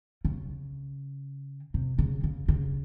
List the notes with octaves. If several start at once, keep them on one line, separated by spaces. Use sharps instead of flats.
C#3
C3
C#3
C#3
C#3